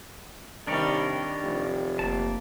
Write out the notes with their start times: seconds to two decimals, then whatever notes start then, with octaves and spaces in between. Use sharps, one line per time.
0.67 C2 D#3 G3 D4 A#4 C#5
1.42 F1
1.99 F#1 A#3 A5